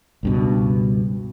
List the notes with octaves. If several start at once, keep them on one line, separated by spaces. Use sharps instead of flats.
C#2 G2 B2